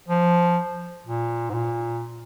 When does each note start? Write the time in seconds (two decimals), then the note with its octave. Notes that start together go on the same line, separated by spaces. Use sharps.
0.08 F3
1.06 A#2
1.49 G#2
1.54 A#2